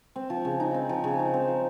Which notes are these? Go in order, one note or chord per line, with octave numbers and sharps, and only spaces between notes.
C4
F3
C#3
D#4
C4
F3
C#3
D#4
C4
F3